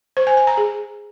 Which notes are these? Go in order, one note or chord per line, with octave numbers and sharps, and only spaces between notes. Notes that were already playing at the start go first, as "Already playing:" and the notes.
C5
G#5
G#5
A#5
G#4